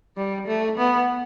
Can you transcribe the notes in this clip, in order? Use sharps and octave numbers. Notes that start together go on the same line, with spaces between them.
G3
A3
B3